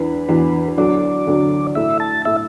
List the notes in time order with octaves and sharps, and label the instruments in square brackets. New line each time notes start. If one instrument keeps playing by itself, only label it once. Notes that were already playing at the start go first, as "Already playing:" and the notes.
Already playing: [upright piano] E2 E3 D4 [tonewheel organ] B4
[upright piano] E2 E3 D4 F#4
[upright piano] D2 D3 F#3 D4 F#4 [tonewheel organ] D5
[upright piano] D2 D3 F#3 D4 F#4
[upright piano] A2 A3 E4 [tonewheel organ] E5
[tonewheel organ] A5
[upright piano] A2 A3 E4 [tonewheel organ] E5